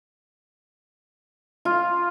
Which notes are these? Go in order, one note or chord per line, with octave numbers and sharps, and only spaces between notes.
F4